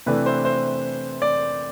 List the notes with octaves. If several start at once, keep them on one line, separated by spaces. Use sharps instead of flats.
C3 E3 A3 D4 B4
C5
C5
D5